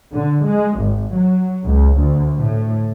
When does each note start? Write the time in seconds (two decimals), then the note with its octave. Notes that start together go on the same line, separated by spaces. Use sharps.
0.12 D3
0.45 G#3
0.79 G#1
1.14 F#3
1.66 C#2
1.98 D2
2.37 A2